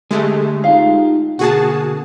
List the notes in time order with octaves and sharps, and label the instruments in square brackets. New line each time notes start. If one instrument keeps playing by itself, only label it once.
[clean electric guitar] D3 G4 [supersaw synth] G#3 A3
[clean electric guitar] D#4 F4 G4 [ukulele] F5
[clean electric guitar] B2 D3 A#3 [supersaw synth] F#4 G#4 A5